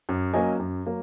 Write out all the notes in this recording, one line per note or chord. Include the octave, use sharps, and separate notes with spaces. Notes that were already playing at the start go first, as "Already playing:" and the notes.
F#2
F#3 A#3 C#4 D#5 G#5
F#2
F#3 A#3